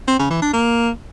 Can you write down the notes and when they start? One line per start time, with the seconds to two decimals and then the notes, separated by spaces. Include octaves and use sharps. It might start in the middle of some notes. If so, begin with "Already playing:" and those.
0.08 C4
0.19 C#3
0.30 E3
0.42 D4
0.53 A#3